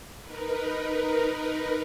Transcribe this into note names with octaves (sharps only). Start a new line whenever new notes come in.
D#4 A#4 B4